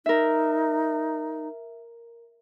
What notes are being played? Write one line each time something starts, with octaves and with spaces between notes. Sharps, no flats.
D#4 A#4 E5